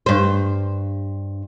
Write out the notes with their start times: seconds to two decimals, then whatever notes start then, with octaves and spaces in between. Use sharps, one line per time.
0.06 G2 C5